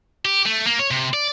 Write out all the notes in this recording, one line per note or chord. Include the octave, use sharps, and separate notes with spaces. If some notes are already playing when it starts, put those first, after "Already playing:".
G4
A3
A#3
C#5
C3
D5